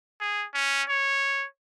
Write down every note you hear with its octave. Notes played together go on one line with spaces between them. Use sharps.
G#4
C#4
C#5